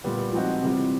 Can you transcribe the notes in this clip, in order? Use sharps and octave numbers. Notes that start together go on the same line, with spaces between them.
A#2 G3 B3
F3 G#3 C4 D#4 F#4
C3 E3 G3